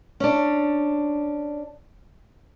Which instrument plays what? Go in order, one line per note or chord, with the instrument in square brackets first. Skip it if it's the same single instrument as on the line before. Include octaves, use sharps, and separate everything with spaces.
[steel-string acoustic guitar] C#4 D4